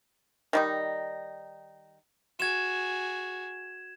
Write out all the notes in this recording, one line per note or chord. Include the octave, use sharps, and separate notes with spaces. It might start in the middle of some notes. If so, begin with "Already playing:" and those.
D#3 G3 D#4
F#4 G#4 G#6 E7